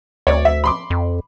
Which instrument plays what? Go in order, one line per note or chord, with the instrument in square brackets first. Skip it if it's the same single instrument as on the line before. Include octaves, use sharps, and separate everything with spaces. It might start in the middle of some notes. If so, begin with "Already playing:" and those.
[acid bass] D2 [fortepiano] C#5 D5
[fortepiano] E5
B5 C6 D6
[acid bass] F2